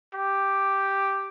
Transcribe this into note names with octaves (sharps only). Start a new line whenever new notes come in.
G4